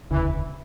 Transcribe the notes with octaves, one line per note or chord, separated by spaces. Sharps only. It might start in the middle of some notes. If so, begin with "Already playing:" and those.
E1 D2 C#3 E3